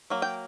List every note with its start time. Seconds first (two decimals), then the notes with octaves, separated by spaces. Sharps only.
0.10 F#3 A#3
0.22 G5